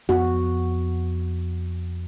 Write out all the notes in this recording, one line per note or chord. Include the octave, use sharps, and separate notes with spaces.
F2 B3 F#4